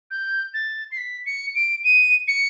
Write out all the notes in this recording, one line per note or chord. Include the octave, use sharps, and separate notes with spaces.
G6
A6
C7
B6
C#7
D7
D#7
C#7